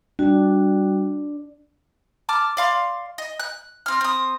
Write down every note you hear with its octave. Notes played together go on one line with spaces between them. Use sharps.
G3 D4 F#4
A5 D6 F6
D5 F5 C6
D#5
F#6
C4 F6
C4 D#6